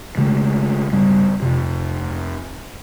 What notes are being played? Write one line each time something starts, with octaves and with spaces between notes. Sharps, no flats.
C#3 G#3 A3
G2 C#3 G3
F2 C3